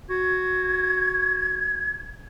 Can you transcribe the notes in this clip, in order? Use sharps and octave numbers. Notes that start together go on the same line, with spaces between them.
F#4 G#6